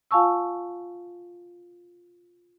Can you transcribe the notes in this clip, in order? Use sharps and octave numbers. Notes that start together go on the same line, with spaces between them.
F4 F5 G#5 A5 C#6 E6